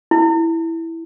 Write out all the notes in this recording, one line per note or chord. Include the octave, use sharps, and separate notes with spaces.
E4